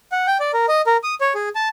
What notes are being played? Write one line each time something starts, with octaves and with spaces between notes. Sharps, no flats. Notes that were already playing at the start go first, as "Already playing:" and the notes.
F#5
G5
D5
A#4
D#5
A#4
D#6
C#5
G#4
A5